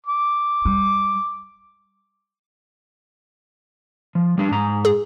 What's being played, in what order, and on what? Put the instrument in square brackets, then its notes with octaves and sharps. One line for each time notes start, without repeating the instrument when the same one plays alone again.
[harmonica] D6
[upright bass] G3
[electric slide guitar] F3
G3 D4
G#2 A#5
[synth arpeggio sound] G#4